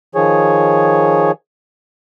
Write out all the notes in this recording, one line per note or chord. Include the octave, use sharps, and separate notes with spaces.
D#3 F3 G#4 C#5